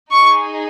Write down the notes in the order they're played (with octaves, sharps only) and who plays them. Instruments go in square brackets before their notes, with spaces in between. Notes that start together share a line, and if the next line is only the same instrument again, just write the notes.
[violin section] D#4 G#4 C#6